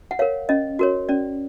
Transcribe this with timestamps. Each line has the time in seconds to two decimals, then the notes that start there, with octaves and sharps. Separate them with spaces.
0.11 F#5
0.19 A#4 C#5 F5
0.49 C#4 D#5
0.79 F#4 A#4 C#5
1.09 C#4 D5